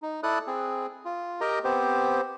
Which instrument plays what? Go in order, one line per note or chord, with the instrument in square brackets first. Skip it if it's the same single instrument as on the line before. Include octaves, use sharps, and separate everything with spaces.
[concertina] D#4
E4 A4 D5 D#6 F#6
C4 G#4
F4
G4 A#4 D#5 G5 A#5
B3 C4 G4 C5